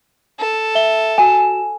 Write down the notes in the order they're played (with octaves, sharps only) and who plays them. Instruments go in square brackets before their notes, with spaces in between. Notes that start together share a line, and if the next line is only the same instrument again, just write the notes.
[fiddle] A4
[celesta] E5 G7
[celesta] F#4 E7 [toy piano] G#5